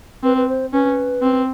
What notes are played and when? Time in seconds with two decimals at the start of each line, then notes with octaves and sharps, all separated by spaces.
0.23 C4 B4
0.37 B4
0.49 C5
0.73 C#4 B4
1.22 C4